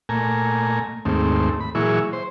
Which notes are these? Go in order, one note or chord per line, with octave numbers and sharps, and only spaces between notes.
A#2 A3 G#5 A#5
D#2 G#2 A3 C4
B5
A#2 E3 F#3 E4 G#4 C#6
C5